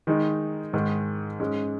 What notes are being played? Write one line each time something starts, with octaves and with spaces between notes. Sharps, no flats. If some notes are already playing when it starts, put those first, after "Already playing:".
D#3 G#3 D#4
G#2 D#3 G#3
G#2 G#3 C#4